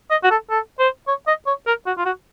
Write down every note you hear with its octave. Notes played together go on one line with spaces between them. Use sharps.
D#5
F#4
A4
A4
C5
C#5
D#5
C#5
A#4
F#4
F4
F#4